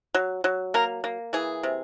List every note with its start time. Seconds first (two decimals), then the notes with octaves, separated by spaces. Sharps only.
0.14 F#3
0.44 F#3
0.74 A#3 A#4
1.04 A#3
1.33 E3 G#4
1.63 C3